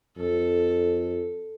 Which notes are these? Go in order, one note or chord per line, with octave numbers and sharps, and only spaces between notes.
F2 A4